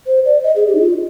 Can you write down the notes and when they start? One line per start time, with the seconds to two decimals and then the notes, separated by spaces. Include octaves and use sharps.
0.07 C5
0.25 D5
0.43 D#5
0.56 G#4
0.68 G4
0.75 D#4
0.80 F4